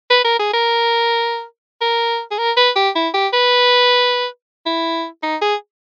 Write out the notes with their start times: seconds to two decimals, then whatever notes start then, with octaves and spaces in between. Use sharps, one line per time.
0.10 B4
0.25 A#4
0.39 G#4
0.53 A#4
1.81 A#4
2.31 G#4
2.38 A#4
2.57 B4
2.76 G4
2.95 E4
3.14 G4
3.33 B4
4.66 E4
5.23 D#4
5.42 G#4